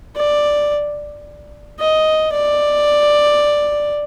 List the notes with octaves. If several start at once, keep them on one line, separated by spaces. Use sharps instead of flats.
D5
D#5
D5